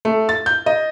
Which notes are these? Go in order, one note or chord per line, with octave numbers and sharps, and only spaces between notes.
A3
A6
G6
D#5